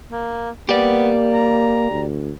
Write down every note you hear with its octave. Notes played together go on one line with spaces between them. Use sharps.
A#3
A#3 B3 G4 D5
A#5
D2